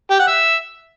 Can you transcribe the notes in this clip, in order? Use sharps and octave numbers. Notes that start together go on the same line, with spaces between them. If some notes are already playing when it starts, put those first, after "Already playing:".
G4
F#5
E5